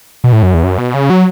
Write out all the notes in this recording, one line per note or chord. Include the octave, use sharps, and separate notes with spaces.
B2
A2
F#2
E2
F#2
B2
C#3
F#3